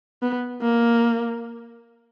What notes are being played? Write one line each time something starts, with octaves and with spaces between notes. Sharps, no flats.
B3
A#3